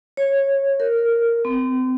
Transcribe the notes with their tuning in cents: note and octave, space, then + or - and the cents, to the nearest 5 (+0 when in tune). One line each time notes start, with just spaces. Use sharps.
C#5 -15
A#4 -5
C4 -35